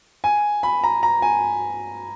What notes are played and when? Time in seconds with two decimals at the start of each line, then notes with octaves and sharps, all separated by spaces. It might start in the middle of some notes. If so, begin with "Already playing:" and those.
0.24 G#5
0.63 B5
0.84 A#5
1.03 A#5
1.22 G#5